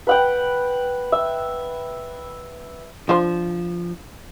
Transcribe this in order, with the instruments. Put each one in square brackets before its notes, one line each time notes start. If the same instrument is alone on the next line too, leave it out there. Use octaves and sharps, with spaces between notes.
[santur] B4 F#5 G5
E5
[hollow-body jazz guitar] F3 [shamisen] D4 F4 C5